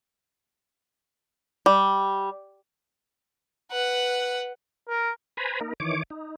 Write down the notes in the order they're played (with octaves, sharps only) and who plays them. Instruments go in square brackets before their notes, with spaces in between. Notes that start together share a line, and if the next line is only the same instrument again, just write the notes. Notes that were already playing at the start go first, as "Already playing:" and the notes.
[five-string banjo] G3
[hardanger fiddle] B4 F#5
[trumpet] A#4
[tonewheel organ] B4 C5 G#5 A#5 B5
A#3 D#4 A#4
D#3 E3 C#5 D6
D#4